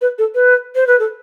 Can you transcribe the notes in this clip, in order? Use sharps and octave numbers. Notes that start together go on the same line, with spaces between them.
B4
A4
B4
C5
B4
A4